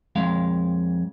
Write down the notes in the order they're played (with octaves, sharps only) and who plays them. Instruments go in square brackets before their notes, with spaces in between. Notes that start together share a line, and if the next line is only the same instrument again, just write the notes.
[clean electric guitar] F2 G#3 F5